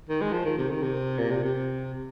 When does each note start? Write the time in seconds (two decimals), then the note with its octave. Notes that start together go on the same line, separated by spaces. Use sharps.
0.09 D#3
0.22 G#3
0.33 F3
0.45 D#3
0.58 C3
0.70 D#3
0.83 C3
1.19 A#2
1.31 C3
1.44 C3